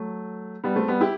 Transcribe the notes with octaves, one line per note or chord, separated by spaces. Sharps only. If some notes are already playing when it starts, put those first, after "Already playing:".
Already playing: F#3 A3
G3 B3
A3 C4
G3 B3
E4 G4